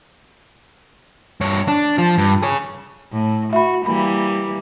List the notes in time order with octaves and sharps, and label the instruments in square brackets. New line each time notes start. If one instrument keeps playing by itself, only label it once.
[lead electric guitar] G2 C#5
D4
F3
G2
G#4 C#5
[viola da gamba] A2
[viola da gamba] F#4 [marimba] E5 B5
[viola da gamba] E3 G3 A#3 [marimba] B5